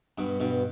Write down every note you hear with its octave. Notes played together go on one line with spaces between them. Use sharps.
G2 B2
G2 B2